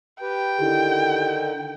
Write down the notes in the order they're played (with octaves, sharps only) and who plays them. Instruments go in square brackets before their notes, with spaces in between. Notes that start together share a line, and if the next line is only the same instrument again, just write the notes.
[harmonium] G4 B4 [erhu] G5
[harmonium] D3 D#3 [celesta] E4 G4